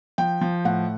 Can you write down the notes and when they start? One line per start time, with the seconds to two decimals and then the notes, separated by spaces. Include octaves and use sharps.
0.18 F3 G5
0.41 F3
0.65 A2 F#5